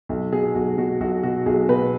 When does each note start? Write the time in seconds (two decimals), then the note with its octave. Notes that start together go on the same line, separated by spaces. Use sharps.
0.09 B1
0.32 B2 G#4
0.55 B1 F#4
0.78 B2 F#4
1.00 B1 F#4
1.23 B2 F#4
1.46 B1 G#4
1.69 B2 B4